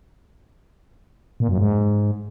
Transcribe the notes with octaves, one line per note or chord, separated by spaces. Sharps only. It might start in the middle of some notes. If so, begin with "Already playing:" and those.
A#2
F#2
G#2